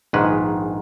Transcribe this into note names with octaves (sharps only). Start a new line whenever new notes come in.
A#1 G#2 D#3 G#3 B4